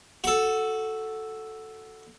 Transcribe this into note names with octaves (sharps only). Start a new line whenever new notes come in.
F#4 A4